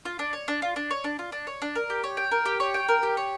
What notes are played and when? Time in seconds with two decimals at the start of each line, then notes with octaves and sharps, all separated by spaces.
0.05 F4
0.19 D4
0.33 C#5
0.48 D4
0.62 F4
0.76 D4
0.91 C#5
1.04 D4
1.19 F4
1.32 D4
1.47 C#5
1.62 D4
1.75 A#4
1.90 G4
2.04 C#5
2.17 G5
2.31 A#4
2.46 G4
2.60 C#5
2.74 G5
2.89 A#4
3.03 G4
3.17 C#5